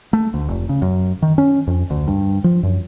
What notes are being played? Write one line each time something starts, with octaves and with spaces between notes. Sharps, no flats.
A3
D2
F1
C#3
F#2
D#3
C#4
F2
D2
G2
F3
F#2